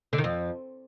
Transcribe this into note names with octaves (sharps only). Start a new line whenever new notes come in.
D3
D#3
F2